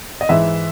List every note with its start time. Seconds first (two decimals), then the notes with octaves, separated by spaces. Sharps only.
0.21 D#5
0.29 G#2 E3 E5